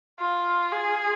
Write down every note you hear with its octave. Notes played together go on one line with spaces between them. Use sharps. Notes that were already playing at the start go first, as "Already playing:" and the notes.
F4
G#4